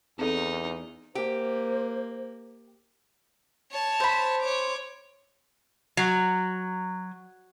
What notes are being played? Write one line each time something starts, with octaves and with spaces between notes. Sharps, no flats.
E2 C4 D#4 A4
A#3 G4 C5
C#5 A5
C5 B5
C#5 D6
F#3